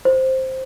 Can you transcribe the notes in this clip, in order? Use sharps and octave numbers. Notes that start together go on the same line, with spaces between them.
C5